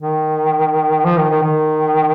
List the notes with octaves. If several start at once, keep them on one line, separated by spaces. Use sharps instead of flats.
D#3
F3
D#3
D#3
D#3